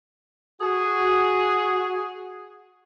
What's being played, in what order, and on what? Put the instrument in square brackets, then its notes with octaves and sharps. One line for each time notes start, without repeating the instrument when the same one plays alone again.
[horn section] F#4 G#4